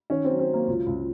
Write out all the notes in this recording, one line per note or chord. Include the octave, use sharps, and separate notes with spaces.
D#3 C#4
C4
F#3
C4
F#3
A#3
C#2 F4
C#2